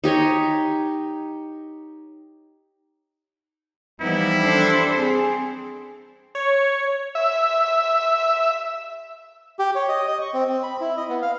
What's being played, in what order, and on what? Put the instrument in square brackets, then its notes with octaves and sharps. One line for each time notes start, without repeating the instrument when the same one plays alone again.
[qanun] D#4 G4 C#5 D#5
[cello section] E3 B3 D#4 [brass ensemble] F3 G3 [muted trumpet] E4
[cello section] D4 A4 C5
[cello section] C4 [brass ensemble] G#4
[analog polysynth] C#5
[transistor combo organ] E5
[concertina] G4
C#5
D#5
D#5
C#6
C4
C4
B5
E4
D#5
B3
F5